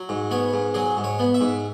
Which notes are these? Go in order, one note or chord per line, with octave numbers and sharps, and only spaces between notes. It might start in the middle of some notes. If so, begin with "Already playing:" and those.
Already playing: F#3
G#2
B3 C#5
G#2
F#3 G#4
G#2
C#5
B3
E5
G#2